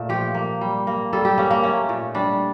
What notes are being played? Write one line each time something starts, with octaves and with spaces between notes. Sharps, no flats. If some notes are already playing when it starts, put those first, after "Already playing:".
Already playing: A#2 A3
F3 G4
A#3
G3
A#3
G3 A4
G4
A#3 C#4
A#3
A3 C#4
A#2
G3 D4